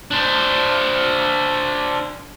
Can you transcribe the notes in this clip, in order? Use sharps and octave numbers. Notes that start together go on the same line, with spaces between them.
D4 C5